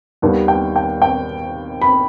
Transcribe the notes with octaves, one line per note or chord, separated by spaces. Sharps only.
D#2 D#3 G3 B3
G5
G5
G5
B5